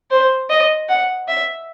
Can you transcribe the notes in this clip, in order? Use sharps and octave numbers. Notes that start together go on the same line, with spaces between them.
C5
D#5
F#5
E5